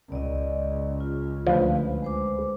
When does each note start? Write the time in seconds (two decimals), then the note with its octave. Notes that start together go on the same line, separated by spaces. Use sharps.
0.12 C#2 D5 D#5
1.01 F4
1.47 D2 F3 B4
2.02 G#3 C5 D6